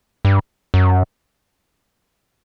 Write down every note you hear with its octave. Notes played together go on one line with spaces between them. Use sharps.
G2
F#2